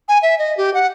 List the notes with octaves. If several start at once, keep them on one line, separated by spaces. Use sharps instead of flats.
G#5
E5
D#5
G4
F#5